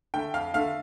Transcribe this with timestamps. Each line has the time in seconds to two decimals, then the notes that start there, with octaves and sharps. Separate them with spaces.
0.14 D3 A3 G5
0.34 F2 F5
0.54 D3 A3 F5